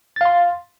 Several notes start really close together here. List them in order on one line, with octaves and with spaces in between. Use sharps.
A6 F5 C6